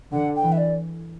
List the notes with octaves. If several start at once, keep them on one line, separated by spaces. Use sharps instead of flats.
D3 F#5
G5
E3
E5
D5